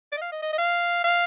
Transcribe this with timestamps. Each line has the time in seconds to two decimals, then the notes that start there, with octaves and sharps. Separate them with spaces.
0.12 D5
0.17 D#5
0.22 F5
0.32 D#5
0.43 D#5
0.53 D#5
0.58 F5
1.04 F5